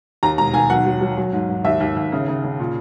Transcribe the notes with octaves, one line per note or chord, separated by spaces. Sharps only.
D#2 A#5
E1 A#5
D#2 G#5
B1 F#5
F#3
F#3
F#3
G#2
G#2
D#2 E5
D#2
D#2
C#3
C#3
C#3
A#2